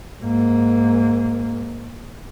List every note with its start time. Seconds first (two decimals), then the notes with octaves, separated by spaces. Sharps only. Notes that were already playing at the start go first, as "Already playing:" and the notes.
0.22 G#2 A#3